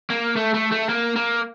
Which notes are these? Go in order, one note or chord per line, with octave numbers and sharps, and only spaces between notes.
A#3
A3
A3
A3
A#3
A#3